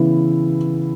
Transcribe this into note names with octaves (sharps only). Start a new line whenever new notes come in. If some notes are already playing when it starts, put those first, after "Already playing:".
Already playing: C#3 E3 B3 E4